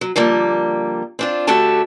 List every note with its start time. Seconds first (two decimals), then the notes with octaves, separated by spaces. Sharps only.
0.01 F#3
0.16 D3 F3 G3 A#3
1.19 C4 D4 F4
1.47 D3 A3 F#4 G4 A4 A5